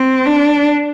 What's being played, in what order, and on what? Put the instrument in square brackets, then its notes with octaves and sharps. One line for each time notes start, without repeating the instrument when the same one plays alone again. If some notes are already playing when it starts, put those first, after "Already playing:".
Already playing: [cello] C4
D4